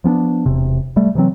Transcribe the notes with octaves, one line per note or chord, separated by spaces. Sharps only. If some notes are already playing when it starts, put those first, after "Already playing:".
F3 B3 C#4 D4
E1 C3
G3 A3
C3 E3 F#3 C4